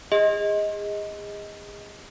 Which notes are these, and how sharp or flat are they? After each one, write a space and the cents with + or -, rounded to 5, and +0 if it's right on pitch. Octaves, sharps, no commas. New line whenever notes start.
G#4 -30 D#5 +10